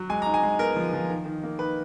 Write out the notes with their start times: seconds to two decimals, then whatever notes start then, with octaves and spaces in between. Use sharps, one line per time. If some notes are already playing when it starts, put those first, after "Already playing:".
Already playing: F#3
0.09 G#3 G#5
0.22 D#4 A#5
0.34 G#5
0.43 G#3
0.59 B3 A#4
0.76 F3
0.93 F3
1.10 D#3
1.26 D#3
1.43 A#3
1.59 D#4 B4